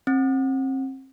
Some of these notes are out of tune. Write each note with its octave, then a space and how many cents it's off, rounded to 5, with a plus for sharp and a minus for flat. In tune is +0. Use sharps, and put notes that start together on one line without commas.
C4 +30